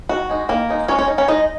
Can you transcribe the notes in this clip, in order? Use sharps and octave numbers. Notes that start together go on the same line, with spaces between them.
D#3 F#4
G#3 D#4
D#3 A#3 A#4
G#3 D#4
G#3 C#4 C#5
C#4 C#5
D#4
C#4 C#5
G#3 D#4 D#5